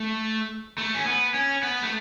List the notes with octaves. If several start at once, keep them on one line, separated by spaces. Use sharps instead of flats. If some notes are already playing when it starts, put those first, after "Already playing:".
Already playing: A3
A3
C#4
B3
C#4
B3
A3